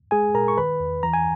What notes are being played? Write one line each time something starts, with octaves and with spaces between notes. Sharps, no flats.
G#3 G#4 G#5
A#2 A#4 A#5
C#6
D#3 B4 B5
E2
E3 A#5
G#5